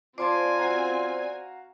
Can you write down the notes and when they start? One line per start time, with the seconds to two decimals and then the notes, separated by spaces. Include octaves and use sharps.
0.18 C4 F4 C5 D5 G#5 A5 C6 D6
0.58 F#4 F5 A#5